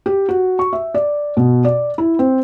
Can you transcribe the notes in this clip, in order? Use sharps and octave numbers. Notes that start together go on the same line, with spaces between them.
G4
F#4
C#6
E5
D5
B2
D5
E4
C4